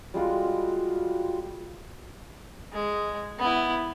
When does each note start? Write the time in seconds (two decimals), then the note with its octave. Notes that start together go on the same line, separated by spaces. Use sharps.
0.14 G3 G#3 F4 F#4
2.73 G#3
3.39 B3 E4